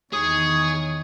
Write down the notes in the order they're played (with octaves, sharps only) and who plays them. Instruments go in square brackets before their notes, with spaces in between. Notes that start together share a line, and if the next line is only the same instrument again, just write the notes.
[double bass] E2 D#3 [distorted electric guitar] G#4 [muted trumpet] C#5 [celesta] D#6